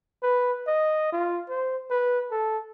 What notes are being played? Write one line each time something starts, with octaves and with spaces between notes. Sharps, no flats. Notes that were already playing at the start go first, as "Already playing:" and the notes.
B4
D#5
F4
C5
B4
A4